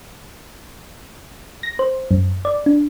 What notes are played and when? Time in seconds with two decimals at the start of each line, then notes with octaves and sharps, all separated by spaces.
1.63 A#6
1.79 C5
2.11 F#2
2.45 D5
2.66 D4